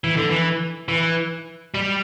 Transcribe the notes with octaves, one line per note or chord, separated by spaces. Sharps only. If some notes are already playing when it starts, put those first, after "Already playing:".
E3
D3
E3
E3
G3